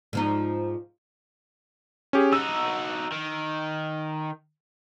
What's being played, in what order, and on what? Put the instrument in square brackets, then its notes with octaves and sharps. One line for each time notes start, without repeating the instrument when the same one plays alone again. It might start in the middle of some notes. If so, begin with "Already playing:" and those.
[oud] G#2 F3 D#4
[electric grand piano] C#4 G4 G#4
[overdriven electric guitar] D#4 F#4 [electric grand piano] E6
[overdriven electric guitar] D#3